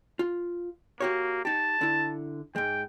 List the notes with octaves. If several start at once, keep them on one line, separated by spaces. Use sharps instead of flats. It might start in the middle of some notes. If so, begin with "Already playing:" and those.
F4
A#3 F#4 G4 C#5
D#4 G4 A5
D3 E4
G#2 G#3 G5